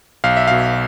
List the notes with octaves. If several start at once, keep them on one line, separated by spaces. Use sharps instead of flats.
B1 F5
E5
B2 F5